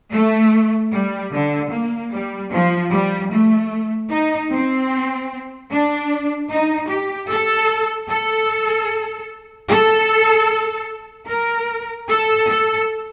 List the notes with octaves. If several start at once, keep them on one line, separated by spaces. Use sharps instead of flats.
A3
G3
D3
A#3
G3
F3
G3
A3
D#4
C4
D4
D#4
G4
A4
A4
A4
A#4
A4
A4